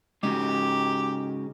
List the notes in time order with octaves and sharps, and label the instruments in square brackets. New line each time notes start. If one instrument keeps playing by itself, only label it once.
[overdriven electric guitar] C#3 D#4 [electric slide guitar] G#3 C#4 F#4 [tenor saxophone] G4